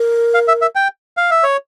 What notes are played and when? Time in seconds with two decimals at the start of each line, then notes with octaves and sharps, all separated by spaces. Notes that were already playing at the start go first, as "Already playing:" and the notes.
Already playing: A#4
0.34 F5
0.48 E5
0.62 E5
0.75 G5
1.17 F5
1.31 E5
1.44 C#5